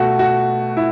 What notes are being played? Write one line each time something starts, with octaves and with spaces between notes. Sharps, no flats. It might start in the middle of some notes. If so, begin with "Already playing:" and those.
Already playing: B2 A3 F#4
F#4
E4